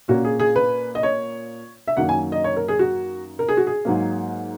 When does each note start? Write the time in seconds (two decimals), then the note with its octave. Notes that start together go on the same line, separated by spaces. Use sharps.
0.08 A#2 A#3 C#4 F#4
0.25 G#4
0.40 G#4
0.56 B4
0.95 D#5
1.03 C#5
1.88 E5
1.97 F#2 D#3 F#3 A#3 F#5
2.09 G#5
2.32 D#5
2.44 C#5
2.56 A#4
2.68 G#4
2.79 F#4
3.39 A#4
3.49 G#4
3.57 F#4
3.67 G#4
3.85 G#2 F#3 A#3